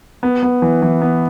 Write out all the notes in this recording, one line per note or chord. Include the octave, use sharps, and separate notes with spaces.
B3
B3
E3
E3
B3